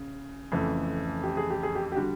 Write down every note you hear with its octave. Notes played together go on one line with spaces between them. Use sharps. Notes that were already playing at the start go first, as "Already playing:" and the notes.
Already playing: C#3
F2 C#3 E3 A3
G4
G#4
G4
G#4
G4
G4
D3 G3 F#4